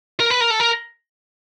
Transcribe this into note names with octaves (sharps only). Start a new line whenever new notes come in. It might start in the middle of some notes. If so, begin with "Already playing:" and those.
A#4
B4
A#4
A4
A#4